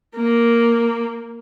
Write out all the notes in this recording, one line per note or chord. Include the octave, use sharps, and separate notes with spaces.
A#3